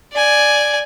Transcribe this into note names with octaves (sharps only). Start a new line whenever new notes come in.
D5 G#5